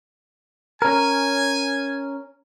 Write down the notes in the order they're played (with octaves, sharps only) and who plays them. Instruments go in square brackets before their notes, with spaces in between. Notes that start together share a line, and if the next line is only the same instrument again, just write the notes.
[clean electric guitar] C#4 A#4 [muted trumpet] G#5